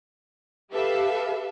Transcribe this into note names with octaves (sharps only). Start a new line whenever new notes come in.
G4 A4 B4 E5 F5